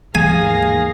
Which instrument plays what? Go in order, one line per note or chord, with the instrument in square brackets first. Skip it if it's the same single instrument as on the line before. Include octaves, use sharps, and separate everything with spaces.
[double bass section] D#2 G#2 D#3 [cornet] G#4 [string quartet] F5 A#6 [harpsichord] G#5